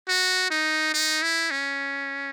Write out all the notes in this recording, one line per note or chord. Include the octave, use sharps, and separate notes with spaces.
F#4
D#4
D#4
E4
C#4